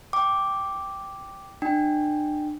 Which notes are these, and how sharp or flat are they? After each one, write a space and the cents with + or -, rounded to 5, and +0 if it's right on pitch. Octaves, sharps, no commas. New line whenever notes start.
G5 +0 D6 +0
D4 +35 G5 -5